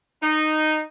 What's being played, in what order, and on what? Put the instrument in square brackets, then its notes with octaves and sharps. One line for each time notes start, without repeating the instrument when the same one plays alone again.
[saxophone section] D#4